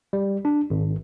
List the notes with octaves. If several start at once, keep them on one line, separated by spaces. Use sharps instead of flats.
G3
D4
G#1